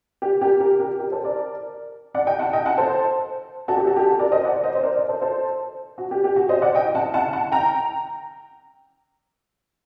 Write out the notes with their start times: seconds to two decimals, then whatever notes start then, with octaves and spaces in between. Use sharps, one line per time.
0.22 G4
0.41 G4 A#4
0.60 G4 A#4
0.79 G4 A#4
0.99 G4 A#4
1.12 A4 C5
1.24 A#4 D5
2.15 D5 F#5
2.27 D#5 G5
2.39 F#5 A5
2.53 D#5 G5
2.66 F#5 A5
2.78 A4 C5
3.68 F#4 A4
3.77 G4
3.87 F#4 A4
3.96 G4
4.06 F#4 A4
4.19 A#4 D5
4.32 C5 D#5
4.45 D5 F#5
4.64 C5 D#5
4.75 C5
4.83 A#4 D5
4.96 A#4 D5
5.08 A4 C5
5.22 A4 C5
5.98 F#4
6.11 G4
6.24 G4
6.36 F#4
6.49 C5 D#5
6.62 D5 F#5
6.75 D#5 G5
6.95 F#5 A5
7.14 F#5 A5
7.33 F#5 A5
7.52 G5 A#5